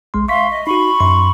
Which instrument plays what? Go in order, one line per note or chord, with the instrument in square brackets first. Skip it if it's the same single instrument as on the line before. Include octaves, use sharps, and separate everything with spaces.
[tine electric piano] A#1 G#3 C6
[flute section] E5 F5 C6 [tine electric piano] C#6 B6
[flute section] D#5
[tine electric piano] D#4 F#4 [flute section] B5 C#6
[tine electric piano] F#2 C6